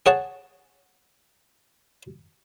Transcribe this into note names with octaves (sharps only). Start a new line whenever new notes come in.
G#4 C#5 F#5 A5